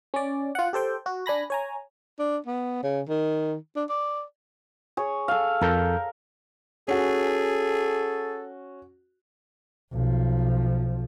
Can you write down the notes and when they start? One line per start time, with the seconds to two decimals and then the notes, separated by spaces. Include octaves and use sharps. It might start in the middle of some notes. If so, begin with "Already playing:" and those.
0.14 C#4 D5
0.55 F4 F#5
0.73 G4 A4 C5 G5
1.06 F#4
1.26 D4 G#5 B5 A#6
1.50 C#5 G#5 A#5
2.19 D4
2.46 B3
2.83 C#3
3.09 D#3
3.76 D4
3.89 D5
4.97 G#4 C#5
5.28 A4 F5
5.61 F2 A4 A#4 G6
6.88 C#4 F#4 G#4 A4
9.92 B1 F3